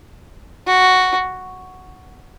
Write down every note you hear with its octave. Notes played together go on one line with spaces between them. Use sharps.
F#4